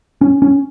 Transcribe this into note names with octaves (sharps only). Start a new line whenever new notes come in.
C#4
C#4